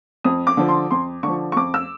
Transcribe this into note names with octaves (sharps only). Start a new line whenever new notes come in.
F2 D#6
D6
D3 F3
C6
F2 C6
D3 F3 C#6
C#6
F2 D6
E6